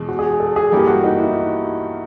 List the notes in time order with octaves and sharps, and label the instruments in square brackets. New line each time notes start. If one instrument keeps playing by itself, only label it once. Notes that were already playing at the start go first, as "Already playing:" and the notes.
Already playing: [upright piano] E2 B2 G#3
[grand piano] F#4
G#4
A4
G#4
[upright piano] G2 E3 G3 A#3 [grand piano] G4
[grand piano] F#4
D#4
E4